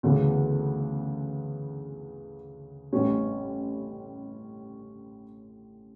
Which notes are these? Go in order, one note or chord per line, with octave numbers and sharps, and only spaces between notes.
D2 C#3 E3 B3
A1 A2 G3 C#4